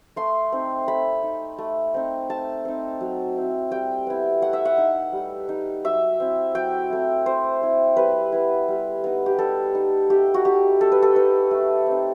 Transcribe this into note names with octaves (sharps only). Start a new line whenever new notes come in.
A3 C6
C4 D#4
A3 B5
D#4
A3
C4 D#4
A3 A5
C4 D#4
F#3
C4 E4
G3 G5
B3 E4
A3 F#5
E5
F#5
D#4
G3
D#4
F#3 E5
C4 E4
F#3 G5
A3 C4 E4
A3 C5
C4 E4
G3 B4
B3 E4
G3
B3 D#4
G4
G3 A4
D#4
A3 G4
F#4
D#4 G4
G3 A4
B4
A4
D#4 B4
A3
C4 D#4